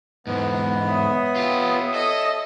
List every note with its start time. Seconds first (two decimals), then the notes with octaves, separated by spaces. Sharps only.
0.27 E2 G#2 B3
0.89 C#5 E5 D#6
1.36 F4 G4
1.94 A4 D#5